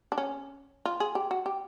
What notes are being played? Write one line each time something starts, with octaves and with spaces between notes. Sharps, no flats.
D4
C#4
F4
G#4
G4
F#4
G4